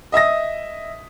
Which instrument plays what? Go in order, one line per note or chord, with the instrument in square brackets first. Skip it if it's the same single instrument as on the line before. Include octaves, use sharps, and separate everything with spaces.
[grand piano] D#5 E5 D#6 A#6